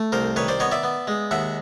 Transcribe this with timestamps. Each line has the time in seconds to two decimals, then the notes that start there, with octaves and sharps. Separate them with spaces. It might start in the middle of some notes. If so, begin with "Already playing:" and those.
Already playing: A3
0.12 C2 A#4 C5
0.36 D#3 B4 C#5
0.48 C5 D5
0.60 B3 C#5 D#5
0.71 D5 E5
0.83 B3
1.07 G#3
1.31 D#2 E5 F#5